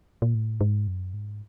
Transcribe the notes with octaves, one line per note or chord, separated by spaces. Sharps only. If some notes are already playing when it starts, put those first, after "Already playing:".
A#2
A2
G#2
F#2
G#2